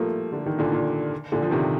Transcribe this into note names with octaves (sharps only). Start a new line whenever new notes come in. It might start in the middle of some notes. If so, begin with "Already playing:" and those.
Already playing: F3 G3 A3 A#3
D3
D#3
A#2 D3
A#2
A#2 D3
F3
C3 D#3